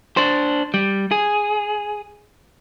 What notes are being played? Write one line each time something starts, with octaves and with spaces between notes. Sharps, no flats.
D4 C5
G3
G#4